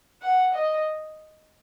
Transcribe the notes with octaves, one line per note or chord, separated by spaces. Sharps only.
F#5
D#5